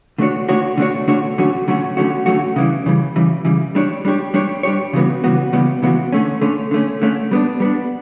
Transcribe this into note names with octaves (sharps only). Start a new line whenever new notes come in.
D3 A3 D4 F#4 C#5
D3 A3 D4 F#4 C#5
D3 A3 D4 F#4 C#5
D3 A3 D4 F#4 C#5
D3 F#3 A3 C#4 F#4
D3 F#3 A3 C#4 F#4
D3 F#3 A3 C#4 F#4
D3 F#3 A3 C#4 F#4
C#3 E3 G3
C#3 E3 G3
C#3 E3 G3
C#3 E3 G3
G3 D4 G4 C#5
G3 D4 G4 C#5
G3 D4 G4 C#5
G3 D4 G4 C#5
C#3 E3 G3 B3 F#4
C#3 E3 G3 B3 F#4
C#3 E3 G3 B3 F#4
C#3 E3 G3 B3 F#4
D3 A3 C#4
D3 A3 C#4
D3 A3 C#4
D3 A3 C#4
G3 B3 D4
G3 B3 D4